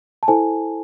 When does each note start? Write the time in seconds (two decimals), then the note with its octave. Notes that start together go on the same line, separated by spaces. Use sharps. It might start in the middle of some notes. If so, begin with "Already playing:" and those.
0.23 A5
0.28 E4 A4 C5 G#5